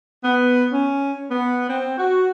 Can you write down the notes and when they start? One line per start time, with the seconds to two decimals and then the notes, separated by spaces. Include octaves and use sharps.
0.24 B3
0.72 C#4
1.31 B3
1.70 C4
1.98 F#4